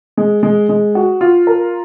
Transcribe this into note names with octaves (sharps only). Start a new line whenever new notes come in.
G#3
G#3
G#3
F#4
F4
A#4